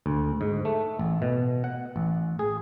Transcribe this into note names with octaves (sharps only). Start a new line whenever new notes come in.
D2
G#2
A3
A1
B2
F#5
A1
G#4